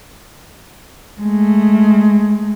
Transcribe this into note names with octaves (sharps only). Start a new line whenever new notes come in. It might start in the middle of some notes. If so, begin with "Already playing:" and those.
G#3 A3